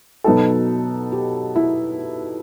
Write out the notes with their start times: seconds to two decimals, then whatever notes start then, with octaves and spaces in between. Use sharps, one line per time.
0.24 B2 F#3 B3 D#4 F#4 A4
1.12 G4
1.56 E4